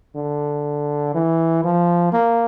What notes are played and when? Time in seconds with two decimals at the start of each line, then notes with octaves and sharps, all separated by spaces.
0.16 D3
1.14 E3
1.64 F3
2.13 A#3